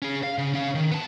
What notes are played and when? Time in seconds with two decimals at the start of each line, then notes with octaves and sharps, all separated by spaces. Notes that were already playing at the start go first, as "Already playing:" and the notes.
0.02 C#4 G#4
0.23 F5
0.38 C#3
0.54 C#4 F5
0.75 D#3
0.92 B3 A5